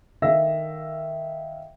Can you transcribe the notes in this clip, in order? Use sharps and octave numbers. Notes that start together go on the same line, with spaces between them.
D#3 A4 E5 F5 E6 A#6